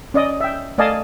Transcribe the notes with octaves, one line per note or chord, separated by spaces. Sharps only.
C#4 D5 D#5
E5 G5
A3 D5 D#5 F5 G#5 A5